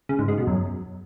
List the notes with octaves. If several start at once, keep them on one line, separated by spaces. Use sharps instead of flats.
C#3
G#2
G#3
B2
F#2